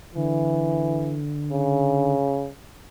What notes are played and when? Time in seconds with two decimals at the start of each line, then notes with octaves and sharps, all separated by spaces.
0.15 D3 E3
1.52 C#3